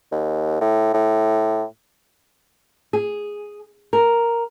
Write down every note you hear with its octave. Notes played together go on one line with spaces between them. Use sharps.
D#2
A2
A2
G#4
A#4